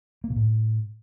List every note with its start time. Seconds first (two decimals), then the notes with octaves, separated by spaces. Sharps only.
0.24 A#3
0.30 B2
0.36 A2